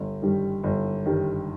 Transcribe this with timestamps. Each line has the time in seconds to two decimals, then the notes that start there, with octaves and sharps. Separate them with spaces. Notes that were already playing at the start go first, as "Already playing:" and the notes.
Already playing: G1
0.22 G2 D#3 G3
0.63 G1
1.06 G2 D#3 G3